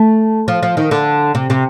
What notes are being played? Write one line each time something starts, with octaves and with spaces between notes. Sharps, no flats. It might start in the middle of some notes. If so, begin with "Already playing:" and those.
Already playing: A3
F3
F3
D#3
D3
C3
C3